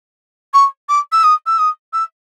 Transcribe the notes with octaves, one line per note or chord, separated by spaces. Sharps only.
C#6
D6
E6
D#6
E6
D#6
E6